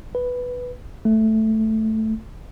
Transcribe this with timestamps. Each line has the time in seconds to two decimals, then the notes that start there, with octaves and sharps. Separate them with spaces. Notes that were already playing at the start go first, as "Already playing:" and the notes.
0.15 B4
1.05 A3